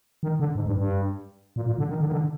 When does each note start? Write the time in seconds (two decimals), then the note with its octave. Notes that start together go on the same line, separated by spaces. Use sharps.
0.23 D#3
0.40 D3
0.55 G#2
0.66 G2
0.78 G2
1.56 A#2
1.66 A#2
1.78 D3
1.89 D#3
2.00 D3
2.07 D#3
2.12 D3